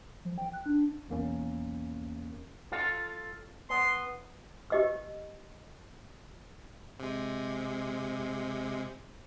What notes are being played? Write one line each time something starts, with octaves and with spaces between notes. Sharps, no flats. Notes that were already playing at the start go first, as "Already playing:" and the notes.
F3
G5
F#6
D4
B1 E2 A#3 C#4
F4 A4 F5
B3 C6
G4 D#5 E6
C3 G#3